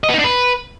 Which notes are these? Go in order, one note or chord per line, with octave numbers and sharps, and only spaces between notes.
D#5
B3
D#4
D4
B4